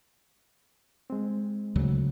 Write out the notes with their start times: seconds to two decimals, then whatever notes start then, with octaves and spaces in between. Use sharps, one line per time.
1.10 G#3 C4
1.76 D2 C#3 F#3